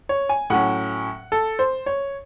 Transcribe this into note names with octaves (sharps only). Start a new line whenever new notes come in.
C#5
G#5
A2 F#3 C#4 F#5
A4
C5
C#5